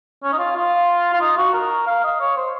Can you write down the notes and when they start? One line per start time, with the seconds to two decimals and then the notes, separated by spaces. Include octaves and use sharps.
0.23 C#4
0.32 D#4
0.39 F4
0.55 F4
1.13 F4
1.21 D#4
1.37 F#4
1.54 A#4
1.86 F5
2.04 D#5
2.20 C#5
2.37 C5